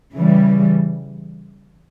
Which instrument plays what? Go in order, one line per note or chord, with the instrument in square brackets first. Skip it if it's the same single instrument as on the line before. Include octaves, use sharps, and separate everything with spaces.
[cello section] C#3 E3 G3